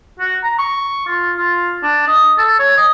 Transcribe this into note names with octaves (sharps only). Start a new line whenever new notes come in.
F#4
A#5
C#6
F4
F4
D4
D#5
A4
C#5
D#5